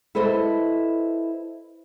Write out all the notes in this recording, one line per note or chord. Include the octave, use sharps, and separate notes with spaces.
E4 A4 B4 C5 D#5 E5